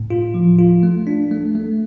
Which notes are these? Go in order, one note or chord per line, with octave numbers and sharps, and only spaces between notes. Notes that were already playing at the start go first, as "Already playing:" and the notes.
Already playing: A2
F4
F3
F4
A3
D4
A3
A3